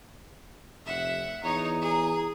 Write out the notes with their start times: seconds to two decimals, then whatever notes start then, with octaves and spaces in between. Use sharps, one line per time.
0.86 F1 E5 F#5
1.43 E2 D#4 C#5 A#5
1.81 G#4